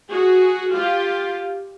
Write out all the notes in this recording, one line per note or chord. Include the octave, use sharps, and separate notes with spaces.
F#4 G#4
F4 G4